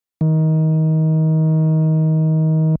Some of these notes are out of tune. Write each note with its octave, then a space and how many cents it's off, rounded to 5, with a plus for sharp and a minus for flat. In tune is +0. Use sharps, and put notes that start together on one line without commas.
D#3 +25